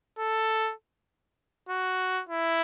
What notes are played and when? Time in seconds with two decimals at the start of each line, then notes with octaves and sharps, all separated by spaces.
0.19 A4
1.69 F#4
2.29 E4